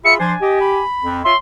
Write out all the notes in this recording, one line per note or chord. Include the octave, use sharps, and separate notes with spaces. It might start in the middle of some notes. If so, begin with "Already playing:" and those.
F4 G#4 E5 B5 C#7
F3 D4 C5 G#5
G4 D#5
B5
F2
F4 C#5 E5 C6